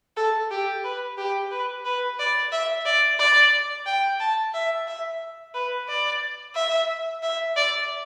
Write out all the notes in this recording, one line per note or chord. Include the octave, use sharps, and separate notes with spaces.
A4
G4
B4
G4
B4
B4
D5
E5
D5
D5
G5
A5
E5
E5
B4
D5
E5
E5
D5